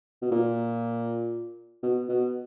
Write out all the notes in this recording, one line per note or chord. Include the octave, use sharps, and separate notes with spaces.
B2
A#2
B2
B2